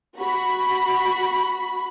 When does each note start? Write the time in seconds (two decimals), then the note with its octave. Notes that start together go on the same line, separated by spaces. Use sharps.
0.19 F#4 B5